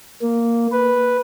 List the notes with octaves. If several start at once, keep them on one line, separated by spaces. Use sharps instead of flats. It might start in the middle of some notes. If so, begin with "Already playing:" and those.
A#3
B4